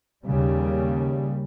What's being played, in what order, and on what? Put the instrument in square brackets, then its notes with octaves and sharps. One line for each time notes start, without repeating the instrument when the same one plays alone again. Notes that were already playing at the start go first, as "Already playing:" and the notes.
[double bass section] D#2 C#3 G3